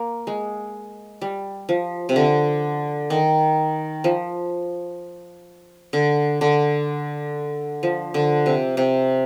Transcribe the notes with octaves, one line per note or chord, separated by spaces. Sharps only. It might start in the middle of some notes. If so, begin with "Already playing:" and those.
Already playing: A#3
G#3
G3
F3
C3
D3
D#3
F3
D3
D3
F3
D3
C3
C3